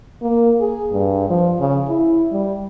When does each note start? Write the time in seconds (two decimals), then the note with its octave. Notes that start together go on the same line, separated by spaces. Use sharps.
0.22 A#3
0.60 G#4
0.91 G2
1.29 F3
1.59 C#3
1.88 E4
2.32 G3